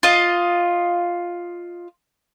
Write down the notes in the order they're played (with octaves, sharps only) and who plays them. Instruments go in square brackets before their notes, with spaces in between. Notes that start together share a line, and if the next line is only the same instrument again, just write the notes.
[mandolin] F4 D#5